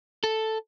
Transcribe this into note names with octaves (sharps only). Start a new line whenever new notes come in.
A4